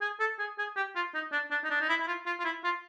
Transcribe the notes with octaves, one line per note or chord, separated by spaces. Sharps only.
G#4
A4
G#4
G#4
G4
F4
D#4
D4
D4
D#4
D4
D#4
E4
E4
F4
F4
F4
E4
F4